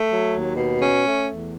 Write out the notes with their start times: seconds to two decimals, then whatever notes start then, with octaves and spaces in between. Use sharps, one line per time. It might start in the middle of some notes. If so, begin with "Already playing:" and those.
Already playing: A3
0.10 F#3
0.33 D#2
0.56 B2
0.81 C#4
1.04 A3
1.27 E2